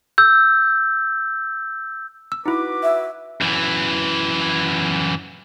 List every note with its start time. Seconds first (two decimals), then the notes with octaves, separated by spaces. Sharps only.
0.18 E6 G6
2.32 E6
2.46 D#4 E4 F#4 B4 D6
2.83 E5
3.41 F#2 E3